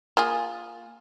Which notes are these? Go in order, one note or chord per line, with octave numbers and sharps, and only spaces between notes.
A#3 F4 G#4